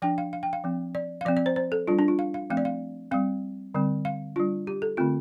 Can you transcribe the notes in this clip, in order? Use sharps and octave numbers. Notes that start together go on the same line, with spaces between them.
F3 D4 G5
F5
F5
G5
F5
F3 C4
D5
F5
F3 C4 D5
D5
C5
C5
A4
G3 D4 F4
D4
F4
F5
F5
F3 A3 C4 F5
D5
F5
G3 C4 F5
D3 G3 C4
F5
G3 D4 F4
G4
A4
D3 A3 C4 F4